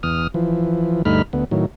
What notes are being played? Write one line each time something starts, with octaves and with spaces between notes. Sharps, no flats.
E2 D#6 F6
E3 F3
D2 G2 A3 D#4 B5 F6
D2 B3
A2 D#3 F#3